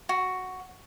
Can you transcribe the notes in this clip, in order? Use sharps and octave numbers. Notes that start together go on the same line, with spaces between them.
F#4